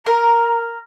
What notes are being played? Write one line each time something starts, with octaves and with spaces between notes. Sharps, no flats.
A#4 A#5